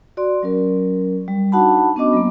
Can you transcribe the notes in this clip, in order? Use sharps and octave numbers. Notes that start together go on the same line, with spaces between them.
F#4 D5 C6
F#3 C#4 A#4
G3
D4 D#4 F#4 F#5 A5 B5
B3 C#4 D4 F#4 D#5 D6
F#3 A#3